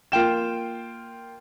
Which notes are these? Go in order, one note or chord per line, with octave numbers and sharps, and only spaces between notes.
A#3 F4 G5 E7